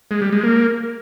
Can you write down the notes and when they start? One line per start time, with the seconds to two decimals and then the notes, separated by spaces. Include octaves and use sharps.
0.11 G#3
0.22 G3
0.33 G#3
0.43 A#3